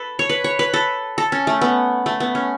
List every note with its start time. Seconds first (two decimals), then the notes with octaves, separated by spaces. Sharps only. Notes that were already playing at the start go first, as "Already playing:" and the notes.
Already playing: A4 B4
0.19 C#5
0.29 B4
0.44 C#5
0.59 B4
0.74 A4
1.18 A4
1.32 C#4
1.47 A3
1.61 B3
2.06 A3
2.20 B3
2.35 C#4